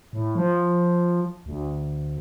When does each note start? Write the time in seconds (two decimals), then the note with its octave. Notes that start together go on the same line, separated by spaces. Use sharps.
0.13 A2
0.35 F3
1.46 D2